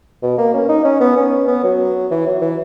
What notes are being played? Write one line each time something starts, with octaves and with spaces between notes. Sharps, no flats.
B2
A#3
C#4
D#4
C#4
B3
C#4
B3
F#3
E3
F#3
E3